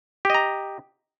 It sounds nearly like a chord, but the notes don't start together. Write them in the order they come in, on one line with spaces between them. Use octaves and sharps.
G4 D#5 A#5